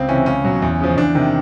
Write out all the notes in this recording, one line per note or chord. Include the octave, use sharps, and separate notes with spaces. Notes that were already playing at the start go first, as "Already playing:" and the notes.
Already playing: C#2 C4
C3 E3 C#4
C#2 C#4
B2 F#3
E2
C#3 F3
E2 D4
C3 D#3